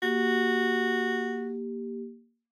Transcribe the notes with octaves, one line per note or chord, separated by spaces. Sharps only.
A#3 F#4 G4